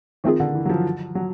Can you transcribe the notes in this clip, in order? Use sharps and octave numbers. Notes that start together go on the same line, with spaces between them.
D#3 F3 A3 C4 F4 G#4
D3
E3
F#3
F3
F#3